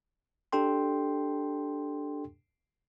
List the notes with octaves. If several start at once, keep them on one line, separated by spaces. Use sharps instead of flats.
D4 G4 A4 G5 C6